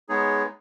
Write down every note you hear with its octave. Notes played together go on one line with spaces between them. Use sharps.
G#3 B3 D#4 G#4 C#5